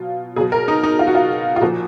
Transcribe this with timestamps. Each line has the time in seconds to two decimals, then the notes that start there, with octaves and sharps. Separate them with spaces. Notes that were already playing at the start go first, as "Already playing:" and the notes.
Already playing: B2 F#3 F4
0.36 B2 F#3 G#4
0.52 A#4
0.68 D#4
0.83 D#4
0.99 F4
1.07 F#4
1.15 F4
1.56 F4
1.61 A#2 F3 F#4